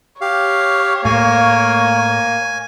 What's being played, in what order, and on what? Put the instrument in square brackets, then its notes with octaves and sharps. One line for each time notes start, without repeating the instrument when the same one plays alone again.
[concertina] G4 F5 [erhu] C#5
[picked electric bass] A2 A3 [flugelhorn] A#3 [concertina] G#5